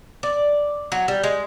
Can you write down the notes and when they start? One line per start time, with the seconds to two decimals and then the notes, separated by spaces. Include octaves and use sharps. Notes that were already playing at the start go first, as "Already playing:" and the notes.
0.23 D5
0.92 F#3
1.08 G3
1.24 G#3